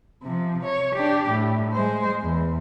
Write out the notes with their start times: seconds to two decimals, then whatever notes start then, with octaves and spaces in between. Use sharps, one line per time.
0.23 C3 F3
0.65 C#5
0.95 D4 G4
1.29 A2
1.73 G#3 C5
2.22 E2